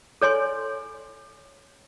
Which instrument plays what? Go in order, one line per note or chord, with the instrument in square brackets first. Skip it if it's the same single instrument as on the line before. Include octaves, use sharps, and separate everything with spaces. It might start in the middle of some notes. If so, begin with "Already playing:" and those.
[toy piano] A4 C#5 G#5 C6